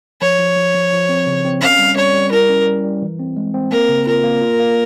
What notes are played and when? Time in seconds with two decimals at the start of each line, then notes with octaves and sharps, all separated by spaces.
0.22 F3 C#5
0.39 F3
0.57 F3
0.75 F3
0.92 F3
1.09 C4
1.27 C#3
1.45 C4
1.61 C#4 F5
1.79 G3
1.96 G3 C#5
2.14 G3
2.31 E4 A#4
2.49 C#4
2.66 G3
2.84 G3
3.02 E3
3.19 C4
3.37 G#3
3.54 C4
3.71 A#3 A#4
3.89 C#3
4.07 F4 A#4
4.24 A#3
4.41 F4
4.60 A#3